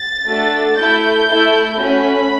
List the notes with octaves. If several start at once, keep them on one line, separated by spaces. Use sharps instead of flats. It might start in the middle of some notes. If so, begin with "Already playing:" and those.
Already playing: A6
A3 D4 F#4 A4
A3 E4 A4 G6
A3 E4 A4
A3 C#4 F#4 B5